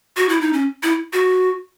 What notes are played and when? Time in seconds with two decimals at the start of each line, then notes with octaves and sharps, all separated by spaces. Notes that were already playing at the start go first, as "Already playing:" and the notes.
0.17 F#4
0.29 E4
0.41 D#4
0.53 C#4
0.83 E4
1.13 F#4